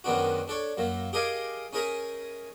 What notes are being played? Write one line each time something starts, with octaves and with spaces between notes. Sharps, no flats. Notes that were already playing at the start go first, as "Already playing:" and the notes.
F#2 D#3 G#3 B3 D4 F#4
D4 A4 C#5
F#2 F#3 A#3
G4 G#4 A#4 D#5 F5 G#5
C#4 D#4 G#4 A#4 E5 A#5